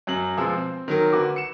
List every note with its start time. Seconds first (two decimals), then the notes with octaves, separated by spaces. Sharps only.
0.07 F#2 F#3 F#7
0.37 B2 F3 G#3 E6
0.55 C4
0.88 D#3 F#3 A#4
1.13 D2 F#4 B4 D6
1.36 C#7 E7